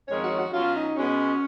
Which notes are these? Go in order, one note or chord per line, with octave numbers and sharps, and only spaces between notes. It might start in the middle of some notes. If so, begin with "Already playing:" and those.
F2 D#3 G#3 C#4 C#5
F#4
F#4
B2 F#3 C#4 F4
D#4
B2 G#3 B3 C#4